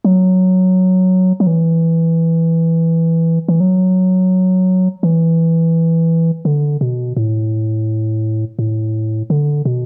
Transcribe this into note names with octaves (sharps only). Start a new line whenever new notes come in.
F#3
F#3
E3
E3
F#3
E3
D3
B2
A2
A2
D3
B2